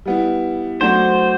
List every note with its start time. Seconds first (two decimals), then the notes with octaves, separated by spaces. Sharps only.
0.05 G3 B3 E4
0.80 F#3 A3 D4 F#4 C5